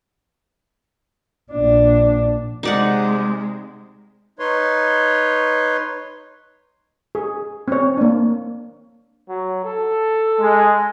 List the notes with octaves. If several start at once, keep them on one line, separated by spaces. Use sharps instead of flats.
A#1 D4
C3 G#3 D#4 D5 F#5
D#4 B4 C#5 C6
G#4
C4 C#5
A#3 D4
F#3
A4
G#3